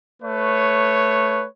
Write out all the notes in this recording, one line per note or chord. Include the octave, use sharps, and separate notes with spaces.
A3 B4 C#5